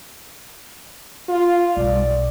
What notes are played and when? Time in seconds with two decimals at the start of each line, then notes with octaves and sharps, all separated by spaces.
1.29 F4
1.77 B1 G3 D5